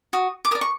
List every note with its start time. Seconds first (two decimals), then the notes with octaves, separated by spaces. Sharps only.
0.13 F#4 D#6
0.45 D6
0.51 A#4 D#6
0.55 D5
0.61 C#6